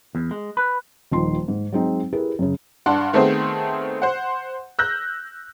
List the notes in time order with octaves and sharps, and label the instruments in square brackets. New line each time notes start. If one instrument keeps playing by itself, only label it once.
[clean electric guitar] E2
G#3
B4
[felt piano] D#1 D#3 F3 C6
G#2
F#3 G#3 C4 D#4
E4 G4 G#4 A#4 B4
F#2 C#3
[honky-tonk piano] G2 D4 F#5 C6
D#3 A3 B3 C4 G#4 C5
C5 F#5
E6 F#6 G6 A#6